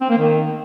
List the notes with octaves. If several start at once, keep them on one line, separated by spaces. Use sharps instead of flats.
C4
A#3
D#3